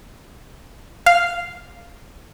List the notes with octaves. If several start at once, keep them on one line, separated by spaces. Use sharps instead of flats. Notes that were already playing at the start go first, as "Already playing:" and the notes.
F5